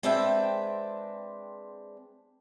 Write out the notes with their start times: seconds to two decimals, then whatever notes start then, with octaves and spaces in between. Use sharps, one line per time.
0.03 G#3 C4 D4 B4 E5 G5